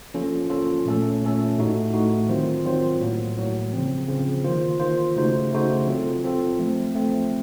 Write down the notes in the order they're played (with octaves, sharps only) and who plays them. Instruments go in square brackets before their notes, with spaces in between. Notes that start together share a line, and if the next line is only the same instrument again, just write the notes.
[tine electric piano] F3 A#3 C#4 F4 A4
F3 A#3 C#4 F4 A4
A#2 A3 C#4 A4
A#2 A3 C#4 A4
A2 A3 D#4 F#4
A2 A3 D#4 F#4
D#3 F#3 C4 F4 C5
D#3 F#3 C4 F4 C5
A2 F#3 A#3
A2 F#3 A#3
C#3 F3 C4
C#3 F3 C4
D#3 A#3 F4 C5
D#3 A#3 F4 C5
C#3 A3 D#4 F#4 C5
C#3 A3 D#4 F#4 C5
F#3 C4 F4 A4
F#3 C4 F4 A4
F3 A3 C4
F3 A3 C4